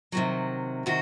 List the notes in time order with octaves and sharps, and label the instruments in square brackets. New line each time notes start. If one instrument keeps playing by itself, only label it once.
[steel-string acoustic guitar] C3 D#3 F#3
C3 D#3 F#4